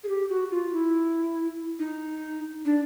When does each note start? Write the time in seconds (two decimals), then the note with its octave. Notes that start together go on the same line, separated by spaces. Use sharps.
0.04 G#4
0.09 G4
0.29 F#4
0.51 F4
0.72 E4
1.79 D#4
2.65 D4